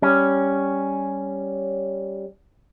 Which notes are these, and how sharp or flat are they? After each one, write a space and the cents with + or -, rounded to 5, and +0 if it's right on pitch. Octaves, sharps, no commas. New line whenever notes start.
G3 +0 C#4 +0